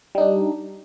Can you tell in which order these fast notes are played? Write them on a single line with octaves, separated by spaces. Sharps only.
G3 D#4 D4